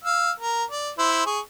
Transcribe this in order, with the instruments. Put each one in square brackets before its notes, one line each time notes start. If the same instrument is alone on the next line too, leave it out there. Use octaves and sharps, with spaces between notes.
[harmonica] F5 E6
A#4
D5
E4 C5
G#4 C#6